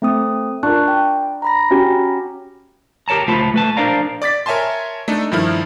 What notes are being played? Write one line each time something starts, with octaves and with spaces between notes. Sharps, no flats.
A3 C4 D#6
D4 F4 A#4 A5 C#6 F#6
G5
A#5 B5 A#6
C#4 F#4 G4
G4 A#4 C#5 A5 A#5
C#2 A3 F4 C5 A5 B5
A3 B4 A5
D4 A#4 C5 D5 F5 A#5
D5 D6 A6 B6
A#4 C#5 E5 G#5 A5 C6
A3 D4 D#4 A4
G2 D#3 F3 E4 F6